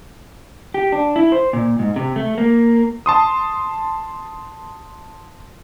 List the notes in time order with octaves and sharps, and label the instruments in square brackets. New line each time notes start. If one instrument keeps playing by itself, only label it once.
[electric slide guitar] G4
D4
E4
C5
A#2
G#2
C3
A3
A#3
[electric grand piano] A5 C6 D#6